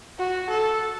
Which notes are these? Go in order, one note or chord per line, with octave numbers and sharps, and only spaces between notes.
F#4
A4